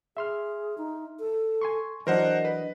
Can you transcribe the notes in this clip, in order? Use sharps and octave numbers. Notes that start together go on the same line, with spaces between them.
G#4 E5 C6 F6
D#4
A4
G#5 C6 C#6
E3 F#3 D4 A#4 C5 D#5 F#5
B4